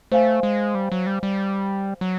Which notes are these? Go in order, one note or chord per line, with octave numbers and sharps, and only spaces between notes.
A3 C5 F5 G#5
G#3
G3
F#3
G3
G3
F#3